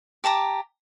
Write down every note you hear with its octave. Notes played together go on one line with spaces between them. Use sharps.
G4 A5 A#5 D6